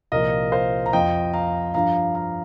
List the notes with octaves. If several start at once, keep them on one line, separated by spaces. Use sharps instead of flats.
C2 A#2 F3 A#4 D#5
C5 F5
A#5
F2 F3 D#5 G5
F5 A#5
G2 F3 F5 A#5
F5 A#5